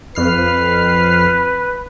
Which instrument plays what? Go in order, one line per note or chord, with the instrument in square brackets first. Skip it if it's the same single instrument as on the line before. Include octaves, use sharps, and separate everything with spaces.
[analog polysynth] F2 F6 C7 [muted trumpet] B4